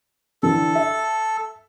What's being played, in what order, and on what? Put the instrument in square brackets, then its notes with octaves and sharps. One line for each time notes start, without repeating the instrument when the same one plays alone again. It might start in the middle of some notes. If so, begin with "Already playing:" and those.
[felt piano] D3 E3 [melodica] A4
[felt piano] E5